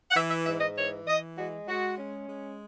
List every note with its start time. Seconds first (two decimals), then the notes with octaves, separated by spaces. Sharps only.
0.10 F#5
0.15 E3 E5
0.30 E5
0.45 G#2 E5
0.60 D#5
0.76 E3 C#5
1.06 E3 D#5
1.37 G#3 F#4
1.67 G#3 F#4
1.98 C#4
2.28 G#3